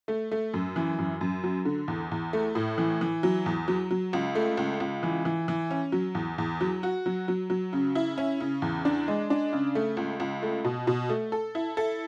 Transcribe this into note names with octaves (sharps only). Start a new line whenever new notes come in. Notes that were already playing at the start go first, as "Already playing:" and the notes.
A3
A3
F#2
E3
F#2
F#2
F#3
D3
E2
E2
A3
A2
E3
E3
F#3
E2
F#3
F#3
C#2
A3
C#2
C#2
E3
E3
E3
C#4
F#3
E2
E2
F#3
F#4
F#3
F#3
F#3
C#3
E4
C#4
C#3
E2
D4
G#3
D4
C#3
A3
C#2
C#2
A3
B2
B2
A3
A4
E4
A4